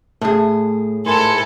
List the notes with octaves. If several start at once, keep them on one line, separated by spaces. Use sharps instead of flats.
A2 A3 G#4
G#2 A3 E4 A4 A#4 G#5 C6